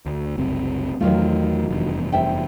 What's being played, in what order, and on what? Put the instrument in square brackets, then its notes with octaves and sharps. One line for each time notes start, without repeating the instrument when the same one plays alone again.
[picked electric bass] D2
F#1 C2 C4
[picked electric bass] E2 A3 [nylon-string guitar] D#3 F#3 F4
[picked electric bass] F1 E2 G2
[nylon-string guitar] C5 E5 G5